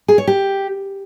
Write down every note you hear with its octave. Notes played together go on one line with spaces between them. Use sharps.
G#4
C#5
G4